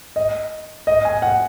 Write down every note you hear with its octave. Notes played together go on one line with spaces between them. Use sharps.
D#5
D#5
G#5
F#5